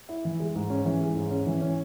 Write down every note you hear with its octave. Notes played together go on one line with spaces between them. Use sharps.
E4
E3
G#3
G#2
C#4
E3
G#3
G#2
C#4
E3
C#4